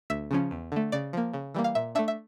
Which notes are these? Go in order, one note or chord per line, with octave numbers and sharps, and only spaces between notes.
D2 E5
C#3 F3 C#4
E2
D3 A3
C#3 D5
F3 A#3
C#3
E3 G3 A#3
F5
A#2 E5
A3 D4 E5
E5